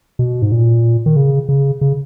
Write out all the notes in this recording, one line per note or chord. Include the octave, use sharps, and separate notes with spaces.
B2
G#2
A#2
D#3
C#3
C#3
C#3